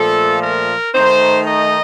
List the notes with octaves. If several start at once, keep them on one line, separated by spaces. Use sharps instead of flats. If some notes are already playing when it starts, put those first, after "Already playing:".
Already playing: A#2 F3 A3 A4
A#4
D#3 A3 D#4 C5
D#5